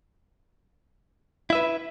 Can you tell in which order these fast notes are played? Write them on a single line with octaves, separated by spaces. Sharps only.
E4 E5 B4